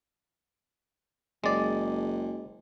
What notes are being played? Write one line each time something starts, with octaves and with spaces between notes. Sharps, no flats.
F#1 G#3 D5